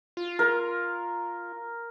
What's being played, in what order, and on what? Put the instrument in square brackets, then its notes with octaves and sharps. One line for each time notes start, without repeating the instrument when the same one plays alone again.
[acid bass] F4
[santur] A#4